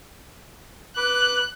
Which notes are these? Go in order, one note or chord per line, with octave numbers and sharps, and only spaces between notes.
B4 D6 F#6